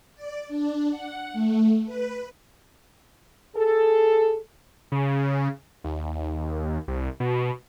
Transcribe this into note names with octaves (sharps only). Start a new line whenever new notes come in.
D5
D4
F#5
A3
B4
G#4 A4
C#3
D#2
C2
B2